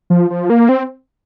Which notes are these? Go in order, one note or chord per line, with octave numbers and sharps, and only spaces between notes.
F3
F3
A#3
C4